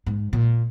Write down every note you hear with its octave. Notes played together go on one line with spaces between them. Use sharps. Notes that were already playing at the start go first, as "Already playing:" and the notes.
G#2
A#2